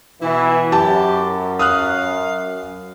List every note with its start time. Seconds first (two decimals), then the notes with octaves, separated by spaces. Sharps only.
0.22 B2 E3 E4
0.72 F#2 G4 A5
1.59 F5 D#6 F6 F#6